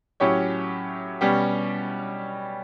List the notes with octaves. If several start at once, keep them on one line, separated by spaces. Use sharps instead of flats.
A2 F#3 C#4 G4 C#5
B2 G3 C#4 G4